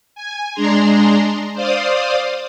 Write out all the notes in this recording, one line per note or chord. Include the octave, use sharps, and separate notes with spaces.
G#5
G#3 D4 G#4 A#5 C6
C5 D5 F5 D#6